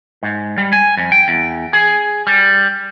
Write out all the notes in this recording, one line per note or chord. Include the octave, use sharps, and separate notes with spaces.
G#2
G3
G#5
F2
G5
E2
G#4
G3